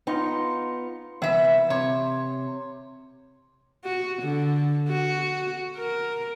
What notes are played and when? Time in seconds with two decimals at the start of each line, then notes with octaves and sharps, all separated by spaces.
0.07 B3 D#4 F4
1.22 C2 E3 B3 E5
1.70 C3 C#5
3.84 F#4
4.22 D3
4.89 F#4
5.77 A#4